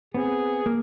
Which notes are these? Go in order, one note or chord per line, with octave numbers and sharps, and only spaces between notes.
B3 C4 G#4
A#3